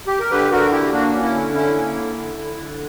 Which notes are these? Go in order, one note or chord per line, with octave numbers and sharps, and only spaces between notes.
G4
A#4
D3 G4 B4
D3 F#4 A#4
A#3 E4 G4
A#3 D4 F#4
C#4
E4
D3
C#4 E4
A#3
D3
D3
D3
D3